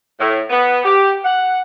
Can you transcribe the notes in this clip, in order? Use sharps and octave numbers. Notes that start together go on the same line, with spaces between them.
A2
B3
G4
F#5